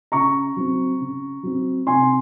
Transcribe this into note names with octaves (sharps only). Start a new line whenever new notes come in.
C#3 A#5 C#6
F#3 C4
C#3
F#3 C4
C3 G#5 C6